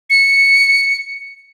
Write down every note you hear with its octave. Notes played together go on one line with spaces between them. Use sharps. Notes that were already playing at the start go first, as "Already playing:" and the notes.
C#7